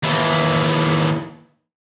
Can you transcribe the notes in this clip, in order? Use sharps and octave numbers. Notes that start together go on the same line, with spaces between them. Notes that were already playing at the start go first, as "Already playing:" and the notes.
D#2 E3